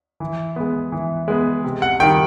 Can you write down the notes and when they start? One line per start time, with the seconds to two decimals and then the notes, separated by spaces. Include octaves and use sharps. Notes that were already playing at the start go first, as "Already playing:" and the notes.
0.20 E3
0.56 G#3 B3
0.92 E3
1.28 G#3 B3
1.64 C3
1.82 F#5
2.00 D#3 G5
2.04 G3